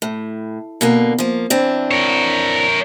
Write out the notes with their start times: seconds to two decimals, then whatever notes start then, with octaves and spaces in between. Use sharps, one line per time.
0.02 A2
0.81 B2 D3 A#3
1.18 F3 A#3
1.50 E3 C4 D4
1.91 A#4 C#5